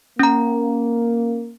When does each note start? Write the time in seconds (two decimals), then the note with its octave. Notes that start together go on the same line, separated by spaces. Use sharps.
0.19 A#3 C#4 A#5